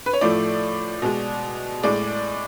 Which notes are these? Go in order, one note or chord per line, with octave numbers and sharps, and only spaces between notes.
B4
C#5
A2 F3 A3 D5
B2 G#3
A2 G#3 D5